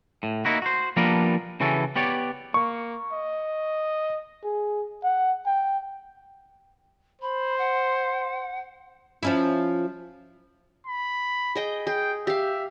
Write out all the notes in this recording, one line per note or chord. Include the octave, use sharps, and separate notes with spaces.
A2
A#3 D#4 E4 F#4
F#4 C5
F3 G3 A#3 B3 D4 A#4
C#3 E3 C#4 F#4 A4
B3 G4 C#5 D5
A#3 C#6
D#5
G#4
F#5
G5
C5 B5
F#5
F3 C#4 E4
B5
G#4 D#5 G5
G#4 G5
G4 E5 F5